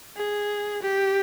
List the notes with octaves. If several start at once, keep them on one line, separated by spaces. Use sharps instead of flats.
G#4
G4